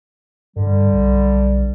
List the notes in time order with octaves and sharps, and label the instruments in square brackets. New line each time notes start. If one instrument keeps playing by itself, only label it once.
[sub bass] G2 [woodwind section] D3 G3
[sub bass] B1